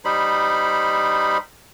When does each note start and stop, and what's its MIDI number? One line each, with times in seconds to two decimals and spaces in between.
0.05 1.38 55
0.05 1.38 63
0.05 1.38 72
0.05 1.38 83